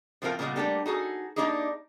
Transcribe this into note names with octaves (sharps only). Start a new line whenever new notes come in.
A2 F3 A3 C4 A#4 F5
A#2 C#3 E3 G3 G#3 B3
G3 A3 A#3 D4 G4 A4
D#4 F#4 G#4 A4
A#3 C4 D4 D#4 G4 G#4